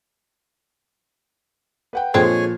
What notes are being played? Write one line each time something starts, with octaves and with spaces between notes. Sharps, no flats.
B4 F#5 G5
A#2 D3 F3 G#3 C4 G#4 C#5 G#5